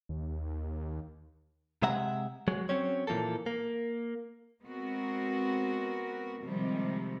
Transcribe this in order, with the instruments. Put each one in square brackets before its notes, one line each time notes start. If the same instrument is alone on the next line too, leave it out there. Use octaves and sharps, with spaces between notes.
[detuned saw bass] D#2
[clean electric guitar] C3 G#3 E5 F#5 A#5
F#3 G#3
F#3 C4 C#4 C#5
A#2 E3 F3 A#3 A4
A#3
[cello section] G#3 B3 C4 F#4 A#4
C3 D#3 F3 G3 G#3